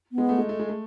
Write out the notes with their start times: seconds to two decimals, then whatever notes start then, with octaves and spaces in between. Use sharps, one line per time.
0.12 B3
0.18 G#3
0.29 A3
0.38 G#3
0.49 A3
0.59 G#3
0.69 A3